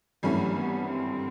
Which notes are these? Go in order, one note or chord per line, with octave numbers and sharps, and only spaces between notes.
G#1 G2 E3 F#3 A3 C#4
B3
C4